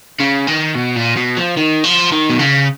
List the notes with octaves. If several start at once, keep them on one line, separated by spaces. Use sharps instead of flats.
C#3
D#3
B2
A#2
B2
F3
D#3
F3
D#3
B2
C#3